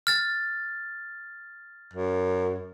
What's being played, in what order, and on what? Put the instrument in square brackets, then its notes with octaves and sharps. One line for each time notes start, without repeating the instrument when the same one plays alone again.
[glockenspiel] F6 A6
[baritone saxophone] F#2